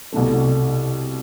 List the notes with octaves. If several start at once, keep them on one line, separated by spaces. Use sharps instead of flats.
C2 B2 A3